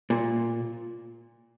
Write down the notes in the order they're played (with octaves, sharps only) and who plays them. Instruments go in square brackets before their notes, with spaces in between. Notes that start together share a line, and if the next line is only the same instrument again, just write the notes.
[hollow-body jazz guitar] A#2